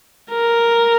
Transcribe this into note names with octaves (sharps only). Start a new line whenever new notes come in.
A#4